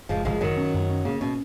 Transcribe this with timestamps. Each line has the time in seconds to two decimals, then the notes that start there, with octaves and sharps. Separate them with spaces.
0.09 F#1 F3 G#3
0.25 F#1 F3 G#3
0.41 F#2 D#3 F#3
0.57 C#4
0.74 F#2
0.89 C#4
1.05 C#3 A#3
1.21 B2 C#4